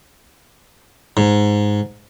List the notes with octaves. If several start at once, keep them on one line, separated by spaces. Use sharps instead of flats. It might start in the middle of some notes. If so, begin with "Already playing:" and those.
G#2